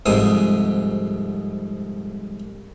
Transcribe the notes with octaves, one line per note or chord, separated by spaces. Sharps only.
C2 F2 G#2 C5 D#6